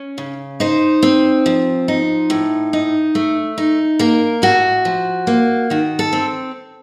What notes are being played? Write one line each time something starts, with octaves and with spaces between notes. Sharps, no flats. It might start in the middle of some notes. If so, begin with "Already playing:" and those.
Already playing: C#4
C#3
D#4 C5
C4
F3
D#4
A2
D#4
A3
D#4
A#3 A#4
A2 F#4
F3
A#3
D#3 F#4
A4
C4